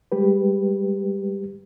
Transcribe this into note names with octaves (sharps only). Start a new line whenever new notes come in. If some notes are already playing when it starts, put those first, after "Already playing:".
G3 G#3 G4 B4